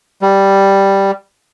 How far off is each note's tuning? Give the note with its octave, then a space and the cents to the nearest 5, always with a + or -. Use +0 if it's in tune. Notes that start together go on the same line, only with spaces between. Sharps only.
G3 +0